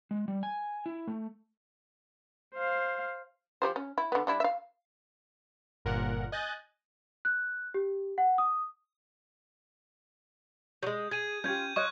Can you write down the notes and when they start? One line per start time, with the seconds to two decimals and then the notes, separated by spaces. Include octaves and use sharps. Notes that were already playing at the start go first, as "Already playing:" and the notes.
0.11 G#3
0.28 G3
0.43 G#5
0.86 E4
1.07 A3
2.55 C5 F5
3.62 F3 G4 C5
3.76 C#4
3.98 E4
4.12 D3 B3
4.27 G3 D4 E4
4.40 E5 F5
5.85 G1 A#2 A#4 F#5
6.32 D#5 G#5 F#6 G6 A6
7.25 F#6
7.74 G4
8.18 F#5
8.38 D#6
10.83 F#3 G#3 G6
11.11 G#4 G#6 D#7
11.44 C#4 F4 G4 G6 G#6
11.76 F4 C#5 D#5 C#6 F#6